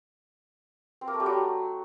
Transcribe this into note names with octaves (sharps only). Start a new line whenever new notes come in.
C4
A#3
A3
G3
F#3